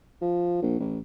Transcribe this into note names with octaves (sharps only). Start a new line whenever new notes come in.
F3
A#1
A1